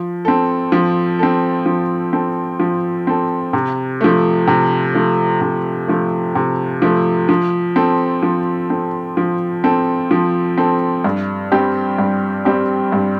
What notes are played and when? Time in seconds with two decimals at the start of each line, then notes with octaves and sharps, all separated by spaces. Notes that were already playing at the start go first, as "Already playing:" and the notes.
Already playing: F3
0.25 C4 A4
0.72 F3
1.19 C4 A4
1.66 F3
2.13 C4 A4
2.60 F3
3.07 C4 A4
3.53 C3
4.01 F3 A3
4.47 C3
4.94 F3 A3
5.41 C3
5.88 F3 A3
6.35 C3
6.82 F3 A3
7.29 F3
7.76 C4 A4
8.23 F3
8.70 C4 A4
9.17 F3
9.64 C4 A4
10.11 F3
10.58 C4 A4
11.04 G2
11.52 G3 C4 G4
11.98 G2
12.45 G3 C4 G4
12.92 G2